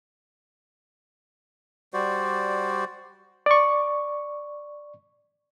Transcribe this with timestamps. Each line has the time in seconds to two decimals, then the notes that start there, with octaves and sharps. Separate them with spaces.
1.93 G3 F#4 C5 D5
3.46 D5 C#6